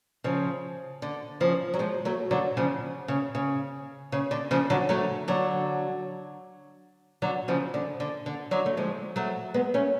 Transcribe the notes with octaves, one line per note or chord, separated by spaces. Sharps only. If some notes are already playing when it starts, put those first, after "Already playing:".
C#3 F3
D3
C#3 F3
F#3
F3 G#3
F#3 A3
D3 F#3
C#3 F3
C#3
C#3
C#3
D3
C#3 F3
D3 F#3
F#3 A3
D3 F#3
D3 F#3
C#3 F3
D3
D3
D3
D3 F#3
A3
F3 G#3
F#3 A3
G#3 B3
A3 C#4